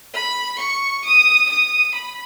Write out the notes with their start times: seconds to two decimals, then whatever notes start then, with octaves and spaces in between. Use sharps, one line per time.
0.14 B5
0.58 C#6
1.05 D#6
1.50 D#6
1.95 B5